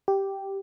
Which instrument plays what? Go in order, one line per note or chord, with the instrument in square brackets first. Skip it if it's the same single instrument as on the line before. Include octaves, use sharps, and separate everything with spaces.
[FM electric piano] G4